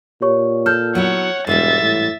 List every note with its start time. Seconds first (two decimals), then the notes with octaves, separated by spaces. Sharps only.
0.22 A#2 G4 C#5 C#6
0.66 A4 F6 G6
0.95 F#3 B3 E4 C#5 F#5
1.47 E1 G#2 E3 G3 E5 A6
1.81 A2